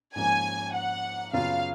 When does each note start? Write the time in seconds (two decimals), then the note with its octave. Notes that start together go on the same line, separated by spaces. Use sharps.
0.15 G#2 F3 A#3 C#4 G#5
0.74 F#5
1.33 F#2 C#3 F#3 B3 F4 F5